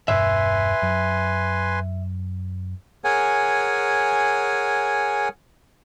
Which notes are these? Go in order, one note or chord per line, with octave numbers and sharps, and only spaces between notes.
E1 G2 B2 B4 E5 G#5 C6
F#2 F#3
G#4 A#4 C#5 F#5 G#5